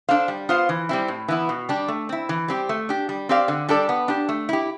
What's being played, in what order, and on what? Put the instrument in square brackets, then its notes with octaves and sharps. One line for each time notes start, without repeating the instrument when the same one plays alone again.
[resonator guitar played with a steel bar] D4 A4 C5 F5
G3
B3 F4 C5 F5
E3
G3 C4 E4
A2
E3 B3 E4
B2
G3 D4 G4
A3
C4 E4
E3
G3 C4 G4
A3
D4 G4
G3
C4 G4 D5 F5
D3
G3 D4 A4 D5
B3
D4 G4
A3
E4 G4